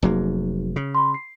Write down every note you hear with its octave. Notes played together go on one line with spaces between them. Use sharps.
F1 F#3 A#3 D#4 F#4 G#4
C#3
B5 C6
C7